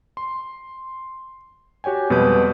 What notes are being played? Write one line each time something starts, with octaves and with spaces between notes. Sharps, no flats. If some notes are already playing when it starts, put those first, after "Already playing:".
C6
F#4 G4 C#5 G5 G#5
F2 B2 G3 G#3 B4 G6